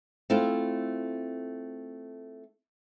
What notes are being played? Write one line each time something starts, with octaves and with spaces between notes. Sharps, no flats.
A3 C4 E4 F4